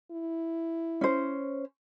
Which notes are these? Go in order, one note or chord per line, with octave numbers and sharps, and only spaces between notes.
E4
C#4 C5